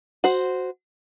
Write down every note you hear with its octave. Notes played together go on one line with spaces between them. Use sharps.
F#4 C5